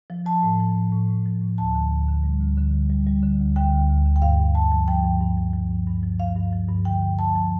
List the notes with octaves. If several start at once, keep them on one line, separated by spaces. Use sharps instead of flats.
F3
F3 A5
A2
F3
A2
A2
A2
F3
A2
D2 A5
D3
D2
D3
G3
D2
D3
G3
G3
G3
D3
D2
D3 G5
D2
D2
D3
G5
G2 F5
G2
G2 A5
F3
F3 G5
G2
G2
F3
F3
G2
G2
F3
G2 F5
G2
F3
G2
D3 G5
D3
F3 A5
F3